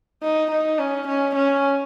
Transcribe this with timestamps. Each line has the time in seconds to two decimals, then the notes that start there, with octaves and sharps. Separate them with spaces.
0.22 D#4
0.51 D#4
0.79 C#4
1.08 C#4
1.36 C#4